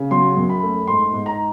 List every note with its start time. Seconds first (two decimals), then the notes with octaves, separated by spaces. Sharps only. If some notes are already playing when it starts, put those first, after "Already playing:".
Already playing: C#3
0.11 F#3 C6
0.37 F#2
0.49 B5
0.63 A3
0.87 G#2 C6
1.13 G#2
1.26 A#5